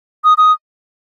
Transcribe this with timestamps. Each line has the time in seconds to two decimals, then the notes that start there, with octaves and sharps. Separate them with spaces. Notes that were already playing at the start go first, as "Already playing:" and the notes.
0.24 D#6
0.38 D#6